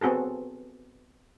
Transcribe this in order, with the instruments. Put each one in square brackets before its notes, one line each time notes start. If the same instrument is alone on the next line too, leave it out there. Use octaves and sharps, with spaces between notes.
[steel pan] B3 C4 F#4 G#4 A4